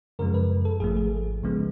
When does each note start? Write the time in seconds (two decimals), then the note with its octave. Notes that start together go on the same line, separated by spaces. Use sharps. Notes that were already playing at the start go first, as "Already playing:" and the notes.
0.19 F#2 C#3 F3 G#3 A#4
0.34 B4
0.65 A4
0.80 G#1 G#2 F3 A3 G#4
0.97 G#4
1.42 C#2 C#3 F3 G#3 B3